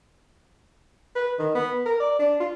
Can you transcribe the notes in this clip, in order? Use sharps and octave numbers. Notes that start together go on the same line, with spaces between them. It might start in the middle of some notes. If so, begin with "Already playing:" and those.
B4
D#3
B3
A#4
D5
D4
F4